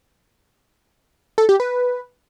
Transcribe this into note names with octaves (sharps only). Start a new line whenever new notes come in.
A4
G4
B4